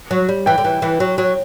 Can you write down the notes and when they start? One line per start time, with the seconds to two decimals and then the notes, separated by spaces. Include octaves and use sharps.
0.11 F#3
0.29 G3
0.46 E3 G5
0.58 D3
0.64 E3
0.82 E3
1.00 F#3
1.18 F#3